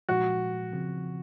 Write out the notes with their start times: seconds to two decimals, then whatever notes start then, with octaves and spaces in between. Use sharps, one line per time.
0.09 A#2 F3 G#3 F#4
0.73 C#3 F3 C4